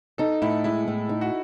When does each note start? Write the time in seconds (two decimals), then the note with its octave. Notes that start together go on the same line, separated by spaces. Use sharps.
0.18 D#4 A4
0.42 A2 E4
0.64 G#3 E4
0.88 A2
1.09 D#4
1.21 F#4